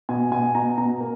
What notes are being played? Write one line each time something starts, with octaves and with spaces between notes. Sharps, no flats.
B2 G#5
B2 G#5
B2 A#5
B2 A#5
A#3